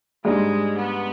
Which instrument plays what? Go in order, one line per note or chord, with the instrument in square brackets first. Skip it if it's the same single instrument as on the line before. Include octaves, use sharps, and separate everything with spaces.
[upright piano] G#2 G3 D4 [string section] G#3
[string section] B3